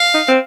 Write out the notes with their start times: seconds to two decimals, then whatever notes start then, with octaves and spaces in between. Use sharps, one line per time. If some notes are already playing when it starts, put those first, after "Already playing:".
Already playing: F5
0.14 D#4
0.28 C4